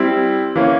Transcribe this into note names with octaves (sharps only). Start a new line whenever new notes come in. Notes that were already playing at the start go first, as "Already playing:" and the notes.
Already playing: G3 C4 E4
E3 A#3 C#4